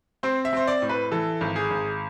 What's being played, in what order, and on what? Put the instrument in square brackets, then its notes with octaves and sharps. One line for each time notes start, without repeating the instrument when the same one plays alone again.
[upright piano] C4 C5
E5
C4 C5
D5
A2
B4
E3 A4
G#1
G#4
G#1